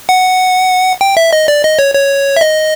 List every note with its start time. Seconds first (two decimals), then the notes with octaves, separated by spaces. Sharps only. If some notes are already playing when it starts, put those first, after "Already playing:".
0.09 F#5
1.01 G5
1.17 E5
1.33 D#5
1.48 D5
1.64 D#5
1.79 C#5
1.95 C#5
2.36 E5
2.41 D#5